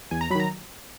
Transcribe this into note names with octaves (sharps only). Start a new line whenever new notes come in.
E2 G#5
A#5
D#3 F#3 A#5 B5